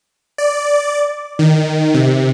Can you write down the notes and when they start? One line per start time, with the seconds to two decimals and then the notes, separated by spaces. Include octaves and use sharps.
0.38 D5
1.39 D#3
1.94 C3